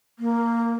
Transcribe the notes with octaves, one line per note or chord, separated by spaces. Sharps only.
A#3